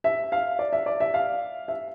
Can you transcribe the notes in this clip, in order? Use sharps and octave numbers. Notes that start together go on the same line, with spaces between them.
E5
F5
D5
E5
D5
E5
F5
E5